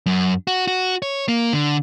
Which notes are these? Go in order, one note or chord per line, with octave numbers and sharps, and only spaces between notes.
F#2
F#4
F#4
C#5
A#3
D3